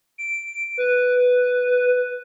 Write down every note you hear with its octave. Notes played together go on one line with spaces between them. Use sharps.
D7
B4